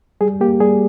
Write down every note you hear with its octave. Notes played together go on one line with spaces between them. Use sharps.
G3 G#4
A#3 G4
G3 G#4